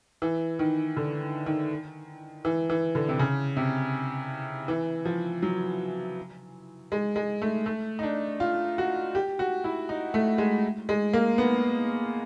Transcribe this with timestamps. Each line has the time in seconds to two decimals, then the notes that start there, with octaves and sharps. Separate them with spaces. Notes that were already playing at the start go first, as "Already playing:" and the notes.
0.22 E3
0.59 D#3
0.97 D3
1.46 D#3
2.45 E3
2.70 E3
2.95 D3
3.09 C3
3.19 C#3
3.57 C3
4.68 E3
5.05 F3
5.42 F#3
6.92 G#3
7.16 G#3
7.42 A3
7.66 A3
7.99 D#4
8.03 D4
8.40 F4
8.78 F#4
9.15 G4
9.39 F#4
9.64 E4
9.89 D#4
10.14 A3
10.38 G#3
10.89 G#3
11.13 A#3
11.38 B3